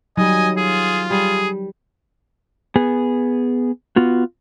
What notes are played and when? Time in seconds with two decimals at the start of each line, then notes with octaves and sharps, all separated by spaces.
0.17 D#3 F#3 G3 D#5 G#5
0.57 F4 G#4
1.11 G3 G#4
2.76 B3 G#4
3.96 B3 F4 F#4